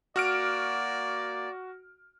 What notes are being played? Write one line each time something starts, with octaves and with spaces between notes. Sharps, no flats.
A#3 F#4 D5 F6 D7